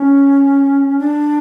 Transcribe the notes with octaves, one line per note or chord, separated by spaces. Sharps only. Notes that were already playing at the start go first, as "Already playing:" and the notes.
Already playing: C#4
D4